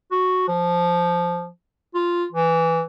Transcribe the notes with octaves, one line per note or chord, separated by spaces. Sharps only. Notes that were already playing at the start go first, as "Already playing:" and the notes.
F#4
F3
F4
E3